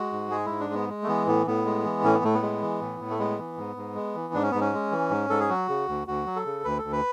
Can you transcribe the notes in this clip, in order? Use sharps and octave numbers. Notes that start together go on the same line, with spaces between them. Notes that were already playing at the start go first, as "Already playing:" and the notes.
Already playing: G#3 F#4
G#2
G#3 G#4
G#2 E4
D4
G#3 B3
G#3
A3
E3 B3
A2 B3
A2 B3
G#3
E3
A2 C#4
B3
A2 A3
B3
G#3
E3
A2
A2
A3
G#3 B3
E3
G#2
G#2
G#3
E3
G#2 D4
C#4
G#2 B3
C#4
G#3
E3
G#2
G#2 A4
G#4
F#3 F#4
C#3
D2
D2 F#4
F#3
A4
C#3
D2 B4
A4
D2
B4